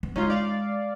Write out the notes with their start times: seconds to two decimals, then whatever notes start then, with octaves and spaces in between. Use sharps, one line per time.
0.03 B3
0.16 G#3 C#4 D#4 F4
0.30 D5 F5